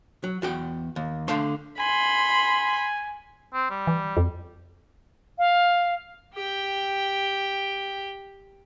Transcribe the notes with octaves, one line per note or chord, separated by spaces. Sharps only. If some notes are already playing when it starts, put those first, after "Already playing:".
F#3
E2 F#4 G5
D#2
D3 A3 F5 A5 C6
G#5 B5 C6
C4
G3
E3
F2
F5
G4 G5